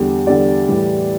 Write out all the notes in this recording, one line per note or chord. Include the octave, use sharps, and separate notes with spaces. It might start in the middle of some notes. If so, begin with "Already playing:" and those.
Already playing: E2 D3 G3
E2 D3 G3 D5
A2 E3 G3